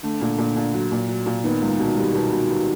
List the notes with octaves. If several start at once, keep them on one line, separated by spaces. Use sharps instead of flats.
D3 A3
A#2
A#2
A#2
F#3
A#2
F#3
A#2
D#3 B3
C#2
B2
G3
B2
B2
B2